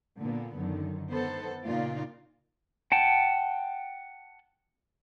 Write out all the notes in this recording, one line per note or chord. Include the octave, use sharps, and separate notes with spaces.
A#2 D3 A#3 B3
F#2 D3 D#3
D#3 B3 A4 C5
A#2 C#3 A#3 D#4 F4 D5
F#5 G5 A5